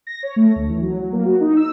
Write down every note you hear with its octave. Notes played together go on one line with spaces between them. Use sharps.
A#6
C#5
A3
D2
E3
F#3
F#3
A#3
F#4
D#4
E6